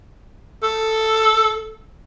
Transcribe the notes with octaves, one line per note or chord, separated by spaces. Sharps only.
A4